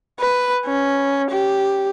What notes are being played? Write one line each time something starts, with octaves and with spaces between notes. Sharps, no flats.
B4
C#4
G4